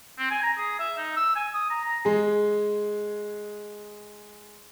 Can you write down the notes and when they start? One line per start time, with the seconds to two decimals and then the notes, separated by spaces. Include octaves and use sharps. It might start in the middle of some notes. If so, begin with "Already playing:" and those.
0.19 C4
0.31 G#5
0.43 A#5
0.57 G#4
0.80 E5
0.97 D#4
1.16 E6
1.36 G#5
1.54 D#6
1.70 A#5
1.84 A#5
2.05 G#3 G#4